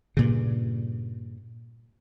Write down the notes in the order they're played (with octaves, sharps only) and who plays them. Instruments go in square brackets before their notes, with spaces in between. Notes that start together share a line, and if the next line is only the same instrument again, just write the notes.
[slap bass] G2 A#2 C#3